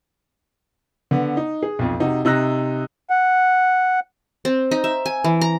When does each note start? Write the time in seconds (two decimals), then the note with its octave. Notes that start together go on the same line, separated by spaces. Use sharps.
1.11 D3 B3
1.37 D#4
1.63 G#4
1.79 B1 F2
2.00 C3 D#4 F#4
2.25 C3 D#4 E6 F#6 A#6
3.10 F#5
4.45 C4
4.71 D#4
4.84 E5
5.06 G#5
5.24 E3
5.41 A#5